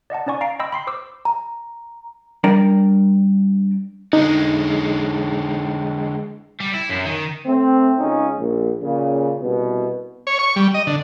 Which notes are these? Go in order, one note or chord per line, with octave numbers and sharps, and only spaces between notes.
D5 D#5 F#5 A5
C#4 D#4 D5 G#5 C#6
F5 A#5 A6 C7 D7
D#5 G5 B5 C6 E6
B5 C6 C7
C5 D6 E6
A#5
G3 D4 A#4 D5 G5 A#5
D3 G#3 D#4
G3
E4
F#2
D#3
A3 C4
C#2 C#4 D#4
A#1
A#2 C#3
C2 B2
C#5
C#6
G3
D#5
D3